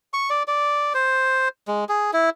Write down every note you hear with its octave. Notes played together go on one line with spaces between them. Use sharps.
C#6
D5
D5
C5
G#3
G#4
E4